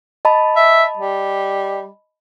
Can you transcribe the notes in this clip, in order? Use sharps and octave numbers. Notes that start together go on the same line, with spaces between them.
D#5 A5 B5
E5
G3